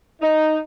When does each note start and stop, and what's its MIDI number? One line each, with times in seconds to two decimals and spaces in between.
0.21 0.57 63